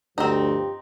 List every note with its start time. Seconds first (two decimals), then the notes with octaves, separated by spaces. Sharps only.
0.18 D2 G2 F3 C4 D#4 G4